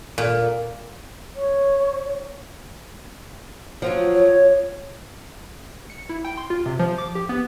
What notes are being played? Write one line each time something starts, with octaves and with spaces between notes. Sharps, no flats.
A#2
C#5
F3 F#3 F4
C#5
C#7
E4
G5
C6
F4
C3
F3
D6
G4
B3